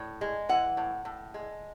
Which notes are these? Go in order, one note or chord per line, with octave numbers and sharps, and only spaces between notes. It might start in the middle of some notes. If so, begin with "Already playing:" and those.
Already playing: A2
G#3
E3 F#5
A2
A2
G#3